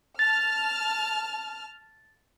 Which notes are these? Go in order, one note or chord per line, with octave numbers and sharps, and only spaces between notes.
A5 F6 A6